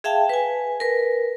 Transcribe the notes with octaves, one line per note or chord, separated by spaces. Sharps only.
G#4 E5 F5 G5 A5
B4 G#5
A#4 B4